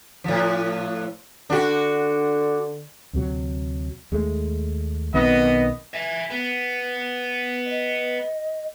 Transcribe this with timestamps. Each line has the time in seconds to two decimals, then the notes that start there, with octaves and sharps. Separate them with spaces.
0.24 A2 F3
1.50 D3 D4 F#4
3.13 D2 C3 F#3
4.12 D#2 G#3 A3
5.14 B1 D#3 B3 C4 D#5
5.94 E5 G#5
6.30 B3
7.66 D#5